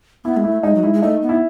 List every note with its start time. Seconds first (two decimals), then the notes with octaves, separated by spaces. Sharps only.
0.25 B3 E4
0.37 G#3
0.44 A3 E4
0.63 G#3 D#4
0.75 F#3
0.83 G#3 E4
0.94 G#3
1.02 A3 D#4
1.22 B3
1.29 E4